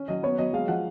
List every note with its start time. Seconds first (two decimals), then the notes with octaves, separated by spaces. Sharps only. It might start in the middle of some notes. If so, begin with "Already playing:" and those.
Already playing: C#4
0.08 F#3 D#5
0.23 B3 C#5
0.38 F#3 D#5
0.53 G#3 F5
0.68 F3 F#5